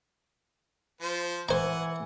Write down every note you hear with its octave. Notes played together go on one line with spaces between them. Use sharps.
F3 C5
E3 C5 F#5 G#5 A#5